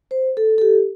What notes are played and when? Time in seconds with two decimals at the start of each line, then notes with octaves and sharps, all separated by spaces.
0.11 C5
0.37 A4
0.58 A4
0.62 G4